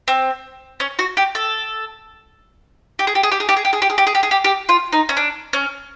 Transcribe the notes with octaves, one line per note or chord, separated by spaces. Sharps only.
C4
C#4
F#4
G4
A4
G4
G#4
G4
G#4
G4
G#4
G4
G#4
G4
G#4
G4
G#4
G4
G#4
G4
G#4
G4
G4
F4
D#4
C#4
D4
C#4